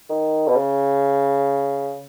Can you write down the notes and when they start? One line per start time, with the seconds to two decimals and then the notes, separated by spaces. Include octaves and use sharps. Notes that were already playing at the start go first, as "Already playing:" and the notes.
0.09 D#3
0.48 B2
0.56 C#3